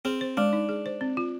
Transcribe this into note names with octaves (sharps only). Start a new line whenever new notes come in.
C4 G#4
C5
G#3 D4
D#4
G#4
C5
C4
F4